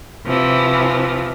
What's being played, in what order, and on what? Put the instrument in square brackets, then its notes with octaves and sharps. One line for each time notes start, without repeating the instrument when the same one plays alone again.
[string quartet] C3 E3 F3